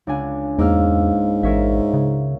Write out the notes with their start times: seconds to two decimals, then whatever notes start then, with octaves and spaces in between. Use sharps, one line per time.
0.07 C#2 D4 G#5
0.59 E2 G#2 A#3 E6 F6
1.43 A1 A#4 C#5 E5
1.94 C#3